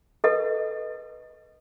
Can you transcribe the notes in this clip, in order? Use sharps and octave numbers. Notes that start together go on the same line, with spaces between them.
A4 B4 D#5